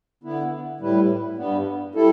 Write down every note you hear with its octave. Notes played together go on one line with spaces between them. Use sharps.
D3 B3 E4
A2 G3 E4 B4
G2 G3 B3
G3 E4 A4